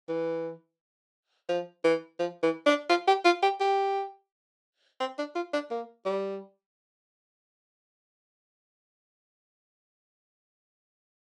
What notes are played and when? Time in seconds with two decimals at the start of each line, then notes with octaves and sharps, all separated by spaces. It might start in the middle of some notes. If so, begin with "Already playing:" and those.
0.09 E3
1.49 F3
1.84 E3
2.19 F3
2.43 E3
2.66 D4
2.89 F4
3.07 G4
3.25 F4
3.42 G4
3.60 G4
5.00 C4
5.18 D4
5.35 F4
5.53 D4
5.71 A#3
6.06 G3